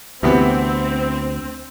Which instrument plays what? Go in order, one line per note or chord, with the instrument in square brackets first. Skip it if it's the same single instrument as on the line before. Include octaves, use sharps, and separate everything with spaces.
[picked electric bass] D2 [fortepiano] C3 E3 B3 [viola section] C4